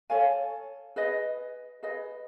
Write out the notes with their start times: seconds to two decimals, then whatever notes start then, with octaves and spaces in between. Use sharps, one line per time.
0.10 A4 C#5 F5 G#5
0.96 G#4 B4 D#5
1.83 G#4 B4 D#5